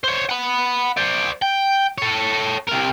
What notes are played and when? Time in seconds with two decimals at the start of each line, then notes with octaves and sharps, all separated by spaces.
0.04 C5 C#5
0.29 F#5 B5
0.97 C5 D5
1.42 G5
1.98 A4 C#5
2.69 C3 A#4